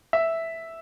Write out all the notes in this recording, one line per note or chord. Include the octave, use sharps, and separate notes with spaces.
E5